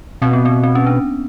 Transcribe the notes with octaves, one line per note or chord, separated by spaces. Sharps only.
B2 C4
B3
C4
C4
C#4
D4